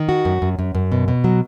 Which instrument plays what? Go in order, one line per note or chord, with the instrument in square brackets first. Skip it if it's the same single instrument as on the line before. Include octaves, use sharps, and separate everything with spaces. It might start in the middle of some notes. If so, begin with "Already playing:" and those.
Already playing: [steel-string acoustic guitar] D#3
F#4
F#2
F#2
F#2
F#2
B2
B2
F#3